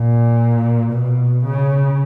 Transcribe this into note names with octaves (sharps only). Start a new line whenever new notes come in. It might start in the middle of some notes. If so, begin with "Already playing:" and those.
Already playing: A#2
B2
C#3